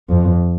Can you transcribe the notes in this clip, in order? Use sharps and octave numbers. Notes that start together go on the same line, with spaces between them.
F2